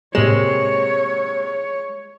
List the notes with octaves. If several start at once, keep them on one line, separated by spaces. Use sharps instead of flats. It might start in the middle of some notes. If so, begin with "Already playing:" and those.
A2 C3 G#3 A#3 C#5 E7